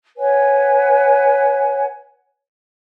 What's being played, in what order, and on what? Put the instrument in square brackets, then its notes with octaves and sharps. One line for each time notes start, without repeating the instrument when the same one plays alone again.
[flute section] B4 C#5 F#5 G#5